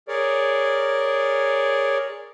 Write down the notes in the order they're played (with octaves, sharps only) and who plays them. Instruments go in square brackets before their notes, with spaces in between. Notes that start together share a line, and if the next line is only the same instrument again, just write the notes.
[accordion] G#4 A#4 C#5 D5